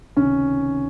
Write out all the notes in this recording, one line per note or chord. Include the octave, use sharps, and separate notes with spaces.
C#2 C3 D#3 C#4